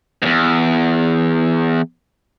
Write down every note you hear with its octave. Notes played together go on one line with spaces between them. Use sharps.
E2 G#2